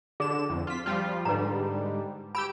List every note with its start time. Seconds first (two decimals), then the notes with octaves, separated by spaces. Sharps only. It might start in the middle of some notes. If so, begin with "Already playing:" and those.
0.20 D3 G#4 E7
0.50 F2
0.67 F4 B6
0.86 F3 G3 F4
1.25 G#2 D3 G3 B4 A#5
2.35 G4 B5 E6 D7